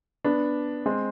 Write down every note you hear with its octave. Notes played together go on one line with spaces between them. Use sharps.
B3 D4
G#3 C4